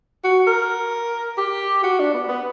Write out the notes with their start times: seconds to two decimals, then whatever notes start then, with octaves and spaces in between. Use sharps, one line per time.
0.24 F#4
0.47 A#4
1.38 G4
1.84 F#4
1.99 D4
2.14 B3
2.29 B3